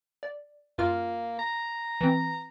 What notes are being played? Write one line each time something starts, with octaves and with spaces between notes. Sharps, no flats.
D5
F#2 A#3 F4 F6
A#5
E3 C4